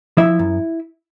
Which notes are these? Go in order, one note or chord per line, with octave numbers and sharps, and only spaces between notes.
F3 E4 E5
F#2